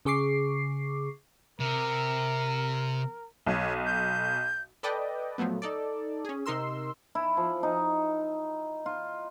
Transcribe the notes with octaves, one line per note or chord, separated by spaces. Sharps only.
C#3 G#4 C#6 D6 C7
C3 A#4
B1 C#5
G6
A4 B4 D5 D#5 G5
A#2 F3 F#3 A3 B3
D#4 A4 D5
C#4 G#4
C3 D#4 A#4 C6 E6
E4
F3
D#4
F4